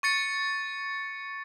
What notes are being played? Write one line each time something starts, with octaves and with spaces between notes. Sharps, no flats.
C#6 A6 C#7